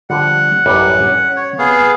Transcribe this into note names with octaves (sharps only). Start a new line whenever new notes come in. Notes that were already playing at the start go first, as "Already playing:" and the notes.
D3 F3 G3 F#5
A1 F#2 G3
C#4 G#5
C#5
C3 B3 G#4 F5